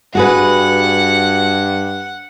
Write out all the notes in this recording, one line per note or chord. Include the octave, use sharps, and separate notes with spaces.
G2 F#4 G#4 B4 F#5